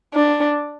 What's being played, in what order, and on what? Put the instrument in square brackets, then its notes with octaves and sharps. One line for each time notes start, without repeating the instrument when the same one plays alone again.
[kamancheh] D4